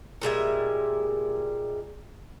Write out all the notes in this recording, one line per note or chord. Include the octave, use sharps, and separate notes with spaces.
A#2 G3 G#3 E5